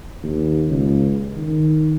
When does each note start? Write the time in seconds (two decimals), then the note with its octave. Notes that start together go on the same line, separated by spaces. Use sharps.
0.23 D#2
0.68 C#2
1.37 D#3